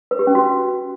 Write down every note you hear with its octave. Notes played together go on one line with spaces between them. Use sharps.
B4
G4
C#4
F#4